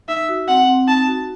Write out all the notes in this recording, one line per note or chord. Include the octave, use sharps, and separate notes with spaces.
D#4 E5
F#4
C4 F#5
C4
D#4 A5
F#4